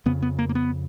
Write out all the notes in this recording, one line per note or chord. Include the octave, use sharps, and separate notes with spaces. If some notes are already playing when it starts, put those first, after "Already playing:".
F2 C#3 B3
B3
A#3
A#3
B3